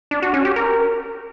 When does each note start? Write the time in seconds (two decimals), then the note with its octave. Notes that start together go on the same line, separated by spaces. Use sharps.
0.11 D4
0.22 F#4
0.34 C#4
0.45 G4
0.56 A#4